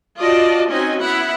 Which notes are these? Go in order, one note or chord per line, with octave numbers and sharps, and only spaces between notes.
F4 F#4 D5 D#5 A5
C4 C#4 D#4 F#4 D#5 G#5
B3 E4 F#5 B5